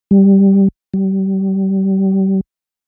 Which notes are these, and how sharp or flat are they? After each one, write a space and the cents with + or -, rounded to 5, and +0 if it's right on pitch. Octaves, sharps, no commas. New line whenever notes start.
G3 +0
G3 -30